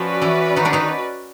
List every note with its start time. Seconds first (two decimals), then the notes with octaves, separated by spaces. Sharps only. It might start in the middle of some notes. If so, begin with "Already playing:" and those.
Already playing: F3 C#4 F4 F#4 B4 D5
0.22 E3 E4
0.56 D#3 D#4
0.65 D3 D4
0.73 D#3 D#4